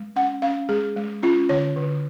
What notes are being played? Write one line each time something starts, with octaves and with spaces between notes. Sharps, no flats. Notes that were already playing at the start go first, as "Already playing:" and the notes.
Already playing: G#3
C#4 F#5
C#4 F5
G#3 G#4
G#3
C#4 F4
D3 C#5
D3